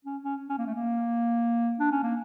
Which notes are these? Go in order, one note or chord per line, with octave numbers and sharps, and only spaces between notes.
C#4
C#4
C#4
A#3
A3
A#3
D4
C#4
A#3